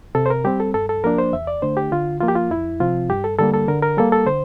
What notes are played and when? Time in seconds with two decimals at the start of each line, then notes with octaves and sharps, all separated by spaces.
0.15 C3 A4
0.26 C5
0.30 A#4
0.44 G3 C4 G4
0.60 A4
0.74 G2 A4
0.89 A4
1.04 F3 A#3 D4 A#4
1.19 C5
1.33 E2 E5
1.47 D5
1.62 D3 A3 D4 C5
1.77 G4
1.92 D3 F4
2.21 F3 A#3 F4
2.28 G4
2.35 F4
2.50 F2 E4
2.80 C3 F3 C4 F4
3.10 G2 G4
3.24 A4
3.38 D3 G3 A#3 A4
3.54 A4
3.68 D3 A#4
3.83 A#4
3.97 G3 A#3 A4
4.12 A4
4.26 D3 C5